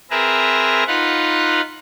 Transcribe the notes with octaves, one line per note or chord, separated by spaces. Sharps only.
C4 G#4 A#4 B4 E5 A#5
D#4 F4 B4 F#5